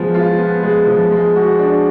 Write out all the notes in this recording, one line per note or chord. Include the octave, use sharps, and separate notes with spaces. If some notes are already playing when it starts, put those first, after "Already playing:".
Already playing: F3 G#3 B3 F4
F4
B3
G#3
F3
G#3
F#4
D4